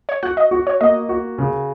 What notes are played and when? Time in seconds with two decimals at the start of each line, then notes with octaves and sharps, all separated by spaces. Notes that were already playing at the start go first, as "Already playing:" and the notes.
0.09 C#5
0.23 F#4 F#5
0.37 D#5
0.51 F#4
0.67 C#5
0.81 A#3 D#5
1.09 F#4
1.38 C#3